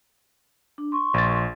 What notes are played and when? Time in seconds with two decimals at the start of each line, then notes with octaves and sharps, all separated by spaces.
0.78 D4
0.92 C6 C#6
1.14 A#1 A6